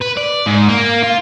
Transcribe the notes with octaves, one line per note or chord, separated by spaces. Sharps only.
B4
D5
G#2
A#3
F4